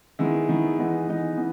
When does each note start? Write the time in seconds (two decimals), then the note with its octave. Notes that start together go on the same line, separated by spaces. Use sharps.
0.19 D#3 G#3 B3 E4
0.49 D#3 G#3 B3 E4
0.78 E3 G#3 B3 D#4
1.07 E3 G#3 B3 D#4
1.37 E3 B3